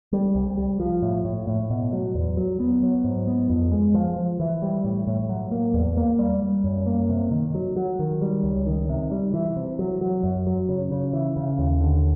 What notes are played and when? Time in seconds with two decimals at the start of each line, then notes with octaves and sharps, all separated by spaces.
0.13 G3
0.35 C2
0.57 G3
0.80 F3
1.02 A2
1.25 A2
1.47 A2
1.70 B2
1.93 F#3
2.15 E2
2.37 F#3
2.60 B3
2.82 F#3
3.04 G#2
3.27 B3
3.50 F2
3.72 G#3
3.94 F3
4.16 F3
4.40 E3
4.62 G3
4.84 A2
5.07 A2
5.29 F#3
5.51 A#3
5.74 E2
5.97 A#3
6.19 G3
6.42 G3
6.64 F#2
6.86 A#3
7.09 C3
7.31 D#3
7.55 F#3
7.76 F#3
7.99 D#3
8.21 G3
8.43 C#2
8.66 D#3
8.89 C3
9.11 G3
9.34 E3
9.56 C3
9.79 F#3
10.01 F#3
10.23 F#2
10.47 F#3
10.69 C#3
10.91 C#3
11.13 E3
11.37 C#3
11.58 D#2
11.81 D3